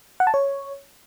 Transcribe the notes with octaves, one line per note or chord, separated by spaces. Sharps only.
F#5
A5
C#5